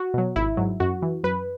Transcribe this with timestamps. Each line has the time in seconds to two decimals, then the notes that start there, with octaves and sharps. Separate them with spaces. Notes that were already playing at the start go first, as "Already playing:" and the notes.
Already playing: F#4
0.14 B2 F#3
0.36 G#1 E4
0.57 G#2 F#3
0.80 F#2 F#4
1.02 E3
1.24 F#2 B4